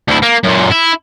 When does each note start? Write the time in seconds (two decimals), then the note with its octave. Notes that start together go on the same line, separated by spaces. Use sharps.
0.08 D2 E4
0.22 A#3
0.43 F#2 A#2
0.71 E4